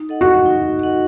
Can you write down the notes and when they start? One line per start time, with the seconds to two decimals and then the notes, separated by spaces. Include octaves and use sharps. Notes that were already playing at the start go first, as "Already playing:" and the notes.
Already playing: D#4
0.09 A4 D#5 F#5
0.21 F#4
0.46 D#4
0.83 A4 D#5 F#5